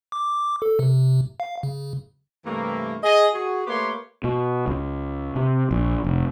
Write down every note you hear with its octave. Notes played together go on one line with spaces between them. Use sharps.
D6
A4
C3
F5
C#3
G2 C3 E3 A3 A#3
G#4 D#5
F#4 G#4
A3 A#3 G4 B4 C#5 C6
B2
C#2
C3
A#1
F1